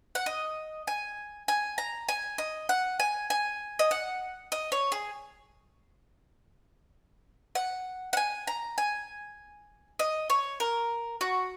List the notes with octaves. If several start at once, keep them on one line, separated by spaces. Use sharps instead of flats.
F#5
D#5
G#5
G#5
A#5
G#5
D#5
F#5
G#5
G#5
D#5
F#5
D#5
C#5
G#4
F#5
F#5
G#5
A#5
G#5
D#5
C#5
A#4
F#4